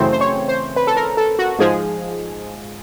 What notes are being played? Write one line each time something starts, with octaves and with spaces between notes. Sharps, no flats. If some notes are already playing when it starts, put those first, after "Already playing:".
Already playing: F#2 C#3 E3 A3 C4 C5
C5
C#5
C5
B4
A4
A#4
A4
F#4
G#2 F3 G#3 G#4